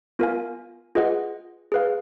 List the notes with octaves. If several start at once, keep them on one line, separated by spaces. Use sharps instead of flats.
B3 F4 A#4 F5 G#5
F4 G#4 B4 D#5 F#5
G#4 B4 F5